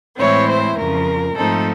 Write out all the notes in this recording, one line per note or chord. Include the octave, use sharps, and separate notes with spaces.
A2 E3 G#3 C4 E4 C#5
C5
F2 C#3 F3 A#4
G#2 F3 A3 C4 D#4 A4